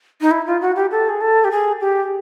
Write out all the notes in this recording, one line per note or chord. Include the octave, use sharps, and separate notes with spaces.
D#4
E4
F4
F#4
G4
A4
G#4
A4
G4
G#4
G4